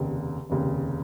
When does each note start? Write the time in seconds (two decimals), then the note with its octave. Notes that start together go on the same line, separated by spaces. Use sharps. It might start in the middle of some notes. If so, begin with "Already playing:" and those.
Already playing: F1 D#2 C#3
0.50 F1 D#2 C#3